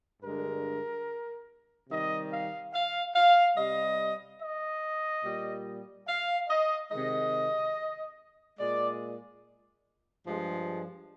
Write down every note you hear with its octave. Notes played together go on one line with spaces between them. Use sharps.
G2 D3 G#3 A#4
C3 D#3 G3 D#5
F5
F5
F5
C3 G3 D#5
D#5
A#2 G3
F5
D#5
C3 D#3 G#3 D#5
A#2 G#3 D5
G2 F3 G#3